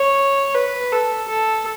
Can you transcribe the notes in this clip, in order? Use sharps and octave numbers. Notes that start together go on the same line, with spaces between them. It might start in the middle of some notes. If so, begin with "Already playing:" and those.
Already playing: C#5
B4
A4
A4